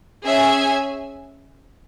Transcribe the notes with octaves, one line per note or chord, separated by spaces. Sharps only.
C#4 G#4 E5 G#5